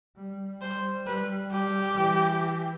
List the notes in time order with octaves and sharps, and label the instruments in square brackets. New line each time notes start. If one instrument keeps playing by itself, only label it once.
[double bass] G3
[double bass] G3 [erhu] C5
[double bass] G3 [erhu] B4
[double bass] G3 [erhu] G4
[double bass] E3